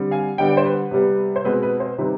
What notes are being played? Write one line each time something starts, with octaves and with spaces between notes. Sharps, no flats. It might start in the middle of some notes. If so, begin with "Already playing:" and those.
Already playing: D3 G3 C4
F5 G#5
D3 G3 B3 D#5 G5
D5
C5
B4
C3 G3 B3
C5
B2 G#3 C4 B4
B4
C5
C3 D#3 G3 C4 B4